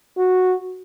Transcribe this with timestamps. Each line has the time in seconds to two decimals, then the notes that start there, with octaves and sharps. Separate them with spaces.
0.18 F#4